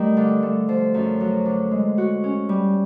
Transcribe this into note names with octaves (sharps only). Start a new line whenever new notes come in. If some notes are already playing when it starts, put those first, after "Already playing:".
Already playing: D#3 G3 A3
D3
A3
F3
F#2
F#3
D3
G#3
F#4
C#4
G3